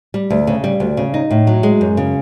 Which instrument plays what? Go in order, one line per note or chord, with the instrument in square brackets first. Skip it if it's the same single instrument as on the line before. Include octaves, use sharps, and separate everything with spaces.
[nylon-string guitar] G3
D2
C#3
G3
D2
C#3
D#4
A2
F#3
G#3
F#2
C#3